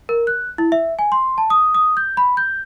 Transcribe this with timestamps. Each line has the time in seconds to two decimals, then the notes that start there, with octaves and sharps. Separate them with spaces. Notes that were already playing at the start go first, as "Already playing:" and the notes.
0.09 A#4
0.27 F#6
0.58 E4
0.72 E5
0.99 G#5
1.12 C6
1.38 A5
1.50 D#6
1.75 D#6
1.97 G6
2.17 B5
2.37 G6